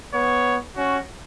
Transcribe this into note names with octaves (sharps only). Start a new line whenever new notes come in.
B3 C#5
C#4 F#4